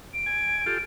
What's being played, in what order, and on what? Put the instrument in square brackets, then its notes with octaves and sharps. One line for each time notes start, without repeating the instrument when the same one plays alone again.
[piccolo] D7
[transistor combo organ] G#5
F4 G4 A4